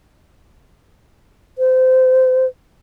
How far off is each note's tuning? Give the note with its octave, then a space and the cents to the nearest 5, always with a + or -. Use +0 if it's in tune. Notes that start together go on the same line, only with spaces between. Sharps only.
C5 -25